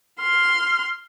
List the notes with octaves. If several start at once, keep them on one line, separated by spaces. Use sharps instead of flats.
C6 F6